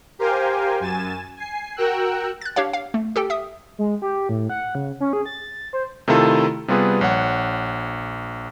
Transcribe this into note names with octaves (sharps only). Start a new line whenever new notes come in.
G4 A#4 C5 F5 G5 G#5
F#2 G#5 A6 E7
G#5 C7
F#4 A#4 G5 E6 F#6
F#6 A6
D4 G4 C#5 F5
F5
A3
G4 A4 G5
E5 D#6
G#3
G4
A2
F#5
C#3
C#4
G#4
A6
C5
C3 D#3 A3 E4 F4 A4
C3 G3 B3 F4 G#4 B4
A#1 C#5 F#5